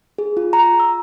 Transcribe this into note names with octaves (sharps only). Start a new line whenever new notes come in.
G#4
F4
A#5
E6